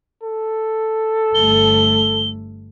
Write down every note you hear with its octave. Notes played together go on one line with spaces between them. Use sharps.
A4
G1 A3 G7